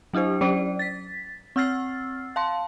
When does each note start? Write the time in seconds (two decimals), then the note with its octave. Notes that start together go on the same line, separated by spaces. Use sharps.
0.13 F#3 D4 E4 G4 C5
0.41 F#3 C#4 C5 D5
0.79 A6 B6
1.56 C4 F#5 E6 F6 A6 C7
2.36 F5 A5 C6